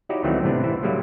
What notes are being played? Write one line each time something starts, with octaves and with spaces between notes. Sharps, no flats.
D#4 E4 F#4 G4 C#5 D5
C#2 D#3 E3 F#3 A3 C4
A2 C3 B3 C4 D4
E3 E4 C5
A2 C#3 F#3 G3 A#3 E4